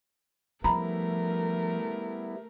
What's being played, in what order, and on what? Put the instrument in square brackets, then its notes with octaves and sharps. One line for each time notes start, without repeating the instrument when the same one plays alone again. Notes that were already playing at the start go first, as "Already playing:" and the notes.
[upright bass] F3 [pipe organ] G3 B3 E4 [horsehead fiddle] A3 A#4 [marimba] A#5 B5